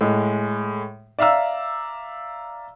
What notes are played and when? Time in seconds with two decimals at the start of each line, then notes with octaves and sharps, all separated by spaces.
0.01 A2 G#3
1.19 D5 E5 F5 A#5 E6